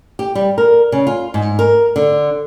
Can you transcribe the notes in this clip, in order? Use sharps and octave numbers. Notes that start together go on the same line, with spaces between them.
G4
G3
A#4
C#3
F4
G#2
A#4
D3